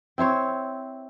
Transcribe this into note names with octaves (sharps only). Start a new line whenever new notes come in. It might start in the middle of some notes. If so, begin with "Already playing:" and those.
C4 E4 C5 C#5